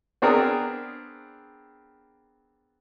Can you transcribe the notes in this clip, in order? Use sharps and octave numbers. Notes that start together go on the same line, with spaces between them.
B3 C4 D4 G#4 A#4